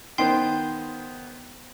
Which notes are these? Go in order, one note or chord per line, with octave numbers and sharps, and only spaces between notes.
D#3 B3 C5 G5 C6 C7